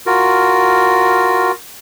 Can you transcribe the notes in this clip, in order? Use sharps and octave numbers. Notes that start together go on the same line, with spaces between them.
F4 F#4 A#4